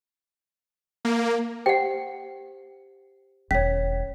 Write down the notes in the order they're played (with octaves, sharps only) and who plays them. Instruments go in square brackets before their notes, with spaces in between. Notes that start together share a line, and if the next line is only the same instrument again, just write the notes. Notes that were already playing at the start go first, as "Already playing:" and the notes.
[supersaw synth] A#3
[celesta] G4 C5 [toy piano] F#5 G5
[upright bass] E1 D#3 [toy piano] C#4 [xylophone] C#5 B6